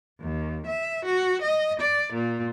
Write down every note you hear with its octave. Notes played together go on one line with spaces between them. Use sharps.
D#2
E5
F#4
D#5
D5
A#2